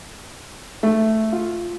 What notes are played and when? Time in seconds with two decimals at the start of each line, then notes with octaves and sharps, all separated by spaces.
0.83 A3
1.32 F4